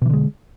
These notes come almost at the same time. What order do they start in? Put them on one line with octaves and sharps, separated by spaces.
B2 E3 D3 G#3